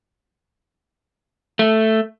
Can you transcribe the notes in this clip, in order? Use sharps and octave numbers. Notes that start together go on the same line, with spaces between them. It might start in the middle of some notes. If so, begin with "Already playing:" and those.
A3